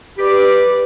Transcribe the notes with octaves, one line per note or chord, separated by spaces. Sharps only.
G4 B4 D5